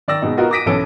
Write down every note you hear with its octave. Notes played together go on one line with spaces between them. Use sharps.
D#3 D5 E6 A#6
B2 G#3 D#4
B3 F4 F#4 A#4 D#5
D6 D#6 A#6 B6 D7 D#7
B1 E3 C#4 A4 D7